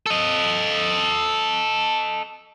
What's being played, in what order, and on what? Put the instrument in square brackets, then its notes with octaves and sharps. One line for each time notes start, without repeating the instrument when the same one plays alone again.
[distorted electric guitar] A4 D#5